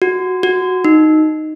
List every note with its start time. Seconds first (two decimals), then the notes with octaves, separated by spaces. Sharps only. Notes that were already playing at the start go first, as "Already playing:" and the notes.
0.02 F#4
0.43 F#4
0.85 D#4